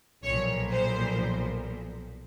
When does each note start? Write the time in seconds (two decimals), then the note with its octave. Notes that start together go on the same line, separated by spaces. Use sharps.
0.24 B1 A#2 F3 C#5
0.71 C5